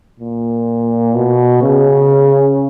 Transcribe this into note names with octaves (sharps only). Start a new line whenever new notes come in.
A#2
B2
C#3